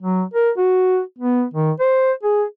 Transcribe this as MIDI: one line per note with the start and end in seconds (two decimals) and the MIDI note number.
0.02 0.23 54
0.34 0.51 70
0.58 1.00 66
1.19 1.44 59
1.54 1.72 51
1.80 2.12 72
2.23 2.44 68